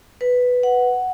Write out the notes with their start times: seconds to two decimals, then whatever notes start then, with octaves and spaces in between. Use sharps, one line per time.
0.21 B4
0.63 F#5